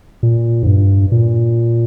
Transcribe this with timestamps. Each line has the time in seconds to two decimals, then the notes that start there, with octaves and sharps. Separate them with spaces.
0.23 A#2
0.63 G#2
0.66 G2
1.12 A#2